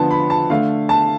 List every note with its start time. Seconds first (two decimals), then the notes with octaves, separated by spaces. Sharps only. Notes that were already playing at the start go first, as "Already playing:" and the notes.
Already playing: D3 F3 B3 A5
0.11 B5
0.30 A5
0.50 D3 A3 F5
0.89 A5